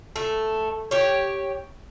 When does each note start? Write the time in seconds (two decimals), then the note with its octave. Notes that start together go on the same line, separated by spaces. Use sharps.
0.16 A3
0.91 G4 C#5